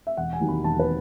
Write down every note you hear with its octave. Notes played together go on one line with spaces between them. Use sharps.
E5
E1 F#5
G#5
D#2 D#3 F#3
B5
E1 A5
B4